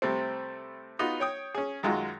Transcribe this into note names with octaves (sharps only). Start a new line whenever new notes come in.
C3 G3 A3 C4
B3 D#4 F4 F#4
C#5 G5 D#6
C#4 G#4
F#2 D#3 G#3 F4 F#4